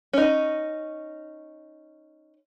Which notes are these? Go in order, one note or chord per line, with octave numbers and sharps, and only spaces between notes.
C#4 D#4